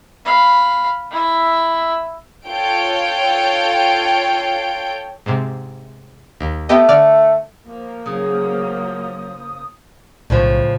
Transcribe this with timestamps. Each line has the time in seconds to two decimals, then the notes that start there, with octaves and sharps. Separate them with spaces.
0.25 F5 B5
1.11 E4 E5
2.47 F4 A4 C#5 G5 G6 D7
5.26 G#2 C3
6.40 D#2
6.69 A3 B3 G4 D#5
6.89 D3 D5 F6
7.66 F3 A#3
8.06 C#3 F#3 D#6
10.30 B1 A2 C#3 F3